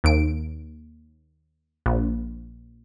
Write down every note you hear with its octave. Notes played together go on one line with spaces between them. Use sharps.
D#2 D7
A#1